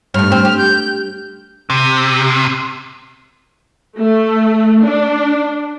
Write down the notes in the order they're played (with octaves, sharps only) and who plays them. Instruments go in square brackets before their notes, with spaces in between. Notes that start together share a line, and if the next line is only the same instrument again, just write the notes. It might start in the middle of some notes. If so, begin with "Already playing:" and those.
[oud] G2 A3 [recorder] F6
[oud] C4
G4
[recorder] G6
[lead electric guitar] C3
[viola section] A3
D4